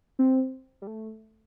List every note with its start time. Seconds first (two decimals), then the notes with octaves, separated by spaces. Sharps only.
0.19 C4
0.82 G3
0.87 A3